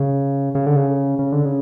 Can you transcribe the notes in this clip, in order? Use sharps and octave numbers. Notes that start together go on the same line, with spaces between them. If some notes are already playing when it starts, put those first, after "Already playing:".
Already playing: C#3
C#3
D3
C#3
C#3
D3
C#3